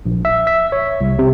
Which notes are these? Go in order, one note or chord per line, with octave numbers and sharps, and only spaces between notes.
A#1
E5
E5
C#5
C2
C3